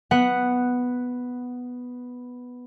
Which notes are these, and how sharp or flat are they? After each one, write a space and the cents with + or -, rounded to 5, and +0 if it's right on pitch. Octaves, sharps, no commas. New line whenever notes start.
B3 +0 F#5 +0